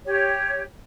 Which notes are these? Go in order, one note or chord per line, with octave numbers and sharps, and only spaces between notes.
G4 C#5